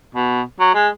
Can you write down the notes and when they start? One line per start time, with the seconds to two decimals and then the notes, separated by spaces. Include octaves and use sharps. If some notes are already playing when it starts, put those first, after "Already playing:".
0.15 B2
0.60 F#3
0.75 G#3